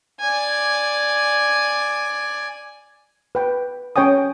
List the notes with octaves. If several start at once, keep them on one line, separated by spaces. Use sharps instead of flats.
D5 G#5
B4 G5
C#4 C#5 G5 G#5 D#6